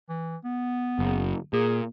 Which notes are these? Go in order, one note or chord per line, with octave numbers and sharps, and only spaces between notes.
E3
B3
F#1
A#2 G#4